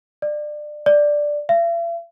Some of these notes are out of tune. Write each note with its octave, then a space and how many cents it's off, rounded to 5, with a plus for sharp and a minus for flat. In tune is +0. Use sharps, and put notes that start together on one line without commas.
D5 +25
D5 +5
E5 +45